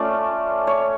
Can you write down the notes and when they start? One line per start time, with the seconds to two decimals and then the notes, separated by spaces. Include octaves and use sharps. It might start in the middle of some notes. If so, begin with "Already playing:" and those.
Already playing: A3 C#4 F4 D5
0.67 C#5